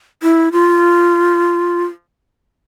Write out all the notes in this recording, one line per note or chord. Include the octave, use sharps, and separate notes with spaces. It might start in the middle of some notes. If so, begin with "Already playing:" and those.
E4
F4